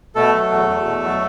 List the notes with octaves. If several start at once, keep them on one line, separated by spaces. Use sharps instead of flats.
B2 A3 A4
F#3
E2
E2
B2
F#3